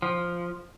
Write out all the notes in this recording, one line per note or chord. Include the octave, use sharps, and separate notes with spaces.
F3